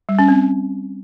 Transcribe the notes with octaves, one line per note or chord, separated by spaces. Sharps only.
G3
C#4
C4